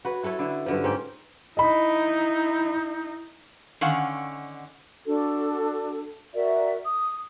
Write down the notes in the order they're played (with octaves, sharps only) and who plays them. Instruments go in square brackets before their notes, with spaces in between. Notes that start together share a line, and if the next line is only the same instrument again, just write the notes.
[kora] F#4 B4 C#5
E4 A4 B4 C#5
D3 E4
G2 D3 F3
G#2 C#4 G5
[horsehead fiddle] D#4 E4 [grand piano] D#5 B5
[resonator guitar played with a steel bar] D3 D#3 C#4 F5 F#5
[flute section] D4 F#4 A4
F#4 A#4 D5 E5
D#6